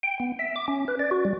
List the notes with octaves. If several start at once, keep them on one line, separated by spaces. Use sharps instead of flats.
G5
B3
E5
D6
C#4
B4
D5
F#4
G3